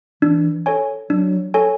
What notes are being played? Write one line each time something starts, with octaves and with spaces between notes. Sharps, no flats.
E3 D4
A4 C#5 G#5
F#3 D4
A4 C#5 G#5